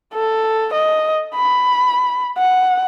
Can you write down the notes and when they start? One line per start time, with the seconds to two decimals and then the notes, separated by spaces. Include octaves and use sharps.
0.14 A4
0.74 D#5
1.35 B5
2.38 F#5